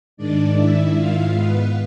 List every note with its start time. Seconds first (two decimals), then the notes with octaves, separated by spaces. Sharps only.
0.17 G#2 D#3 G#3 D4 D5
0.56 E4 E5
0.96 F4 F5
1.34 B3 B4